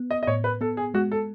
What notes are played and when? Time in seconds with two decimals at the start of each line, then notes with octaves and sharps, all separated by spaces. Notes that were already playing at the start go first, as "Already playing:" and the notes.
Already playing: B3
0.11 D#5
0.23 D#5
0.27 A2 C#5
0.44 B4
0.61 B3 A4
0.77 G#4
0.94 G#3 F#4
1.12 A4